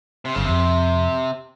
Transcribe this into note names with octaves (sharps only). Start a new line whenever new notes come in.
C3
G1 G2 C#3
F2 C3